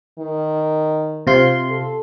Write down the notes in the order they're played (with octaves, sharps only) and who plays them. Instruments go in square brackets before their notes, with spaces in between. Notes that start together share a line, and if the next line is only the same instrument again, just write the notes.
[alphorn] D#3
[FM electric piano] C3 F4 C6
[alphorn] A4